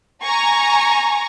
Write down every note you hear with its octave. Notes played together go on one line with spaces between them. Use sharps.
G#5 A#5 C#6